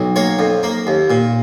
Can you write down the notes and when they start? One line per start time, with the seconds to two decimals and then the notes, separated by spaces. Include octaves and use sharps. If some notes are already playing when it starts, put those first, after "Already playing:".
Already playing: B1 F#3
0.16 A#3 C#5
0.39 F2
0.63 A#3
0.87 D#2
1.10 A#2